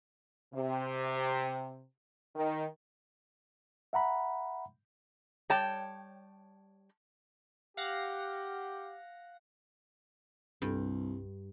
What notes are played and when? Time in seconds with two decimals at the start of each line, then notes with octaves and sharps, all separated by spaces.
0.54 C3
2.35 D#3
3.93 E5 F#5 A#5 B5
5.50 G3 C#5 G5 A5
7.77 G4 F5 F#5 A#6
10.62 C2 G2